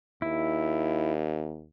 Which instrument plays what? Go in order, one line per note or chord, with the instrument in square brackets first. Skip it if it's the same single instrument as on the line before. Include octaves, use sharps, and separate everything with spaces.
[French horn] D#2 [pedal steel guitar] E4